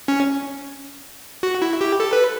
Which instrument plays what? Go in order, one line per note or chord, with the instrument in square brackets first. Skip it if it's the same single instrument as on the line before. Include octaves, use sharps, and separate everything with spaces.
[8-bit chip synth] C#4
F#4
E4
G4
A4
B4